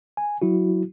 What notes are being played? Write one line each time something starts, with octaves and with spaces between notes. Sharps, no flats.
G#5
F#3 E4 F#4